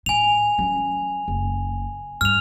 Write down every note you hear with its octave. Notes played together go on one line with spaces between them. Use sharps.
A2 G#5 F7
F#3 C#4
F#1
G2 F6 F7